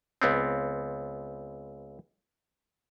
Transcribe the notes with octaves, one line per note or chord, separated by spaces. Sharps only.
C#2 B3 C4